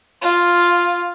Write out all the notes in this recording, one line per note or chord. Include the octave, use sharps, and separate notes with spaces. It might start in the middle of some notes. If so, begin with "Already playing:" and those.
F4